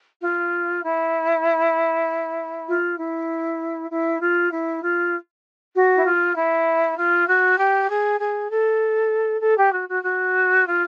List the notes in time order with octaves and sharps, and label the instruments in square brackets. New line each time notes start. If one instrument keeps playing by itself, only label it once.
[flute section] F4
E4
F4
E4
E4
F4
E4
F4
F#4
E4
F4
E4
F4
F#4
G4
G#4
G#4
A4
A4
G4
F#4
F#4
F#4
F4